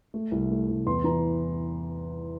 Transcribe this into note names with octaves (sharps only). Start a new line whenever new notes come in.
A3
C2
A3
C2
E2 C6
E3 A#5